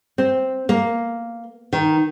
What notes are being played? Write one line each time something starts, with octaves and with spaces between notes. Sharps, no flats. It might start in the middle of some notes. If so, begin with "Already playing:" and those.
C4
A#3
D#3